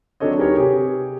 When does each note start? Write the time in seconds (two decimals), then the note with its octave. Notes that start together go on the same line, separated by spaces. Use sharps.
0.20 F#3 C4 D4 A4 C#5 D#5
0.38 D#4 G4 G#4 A#4 B4 C#5
0.56 C3 G4 G#4